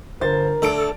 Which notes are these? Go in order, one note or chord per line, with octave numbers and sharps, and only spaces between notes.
G1 A#4 C5 A6
D2 A4 G5 A5 D7